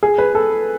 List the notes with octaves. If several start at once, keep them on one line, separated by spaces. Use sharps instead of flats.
G#4
B4
A4